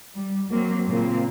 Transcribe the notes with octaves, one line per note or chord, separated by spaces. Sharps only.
G3
F#3 A#3 C4
A#2 C#3 A#3 C4